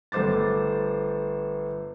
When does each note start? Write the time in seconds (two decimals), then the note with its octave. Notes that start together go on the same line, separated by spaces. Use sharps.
0.12 G1 A3 C5 D6 A6